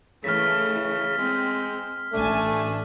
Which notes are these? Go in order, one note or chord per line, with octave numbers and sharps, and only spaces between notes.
C#3 E3 A3 F6 B6
G#3 C4
A1 A3 D4 G#5 A5